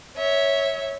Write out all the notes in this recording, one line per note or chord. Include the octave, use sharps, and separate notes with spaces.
C#5 E5